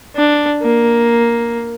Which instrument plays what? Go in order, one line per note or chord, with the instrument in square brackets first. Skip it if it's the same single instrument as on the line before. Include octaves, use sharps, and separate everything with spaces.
[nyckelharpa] D4
A#3